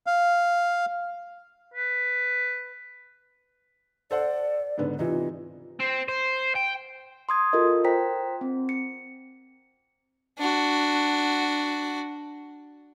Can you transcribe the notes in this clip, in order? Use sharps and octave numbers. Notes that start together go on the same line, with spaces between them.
F5
B4
A4 C5 D5 F#5
G#2 D3 B3
C3 E3 D#4 F4
C4
C5
G5
C6 D#6 G#6
F4 F#4 A4 A#4 D#5
C5 G5 A#5 B6
C4
C#7
D4 F#4